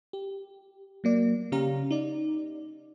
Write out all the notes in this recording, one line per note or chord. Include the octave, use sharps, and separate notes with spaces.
G4
F#3 A#3 D5
C#3 C#4 G4 F5 A#5
D#4 D5